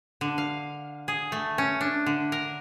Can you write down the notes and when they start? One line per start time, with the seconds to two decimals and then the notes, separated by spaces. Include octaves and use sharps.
0.21 D3
0.38 F5
1.08 G#4
1.32 A3
1.58 C#4
1.81 D4
2.06 D3
2.32 A#4